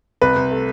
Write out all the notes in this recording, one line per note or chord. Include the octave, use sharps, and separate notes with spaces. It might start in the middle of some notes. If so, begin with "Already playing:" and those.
C2 B4
C2
A3